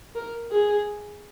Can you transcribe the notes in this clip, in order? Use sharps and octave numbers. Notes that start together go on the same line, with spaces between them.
A#4
G#4